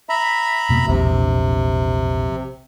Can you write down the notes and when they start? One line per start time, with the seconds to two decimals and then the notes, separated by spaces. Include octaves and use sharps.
0.09 E5 A#5 B5
0.69 F2 B2 A#3
0.87 E1 A#1 E2 C3